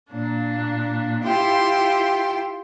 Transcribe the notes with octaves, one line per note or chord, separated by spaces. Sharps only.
A#2 A#3 D4
E4 F4 G4 G5 C6